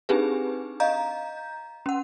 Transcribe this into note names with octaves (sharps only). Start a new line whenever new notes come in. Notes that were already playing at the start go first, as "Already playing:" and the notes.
C4 D4 D#4 G4 G#4 B4
D#5 F5 A#5 G6
C#4 F#5